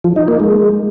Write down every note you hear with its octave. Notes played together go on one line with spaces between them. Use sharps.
F3
D#4
A#3
G#3